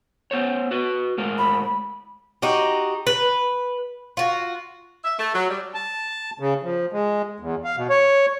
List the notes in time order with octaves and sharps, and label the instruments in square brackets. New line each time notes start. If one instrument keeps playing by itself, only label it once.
[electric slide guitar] B3 C5 C#5
F#4 B4
A2 G#3 A#4
[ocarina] B5
[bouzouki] D#4 F#4 G4
B4
F4 F#4
[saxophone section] E5
A3
F#3
G3
[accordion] A5
C#3
F3
G#3
E2
F5
B2
C#5